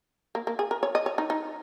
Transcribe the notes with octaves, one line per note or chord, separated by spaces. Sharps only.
A#3
A#3
G#4
A#4
C#5
D#5
C#5
D#4
D#4